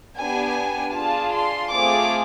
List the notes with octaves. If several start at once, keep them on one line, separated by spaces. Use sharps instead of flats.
B3 D4 G4 G#5
D4 F4 G#4 A5
C6
A3 C4 F4 G#4 D6